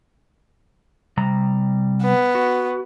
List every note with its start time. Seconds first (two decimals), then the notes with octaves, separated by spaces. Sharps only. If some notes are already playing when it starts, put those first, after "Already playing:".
1.17 C3 G3 A#5
2.02 B3
2.35 F#4